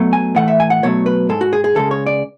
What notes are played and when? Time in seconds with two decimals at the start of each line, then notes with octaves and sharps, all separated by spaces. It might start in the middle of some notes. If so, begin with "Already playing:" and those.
Already playing: B1 B2 F#3 A3
0.13 G#5
0.36 A2 E3 A3 F#5
0.48 E5
0.60 G#5
0.70 F#5
0.83 B1 B2 F#3 A3 C#5
1.06 B4
1.29 G#2 G#3 A4
1.41 F#4
1.53 G#4
1.64 G#4
1.75 C#2 C#3 G#3 A4
1.91 C#5
2.06 D5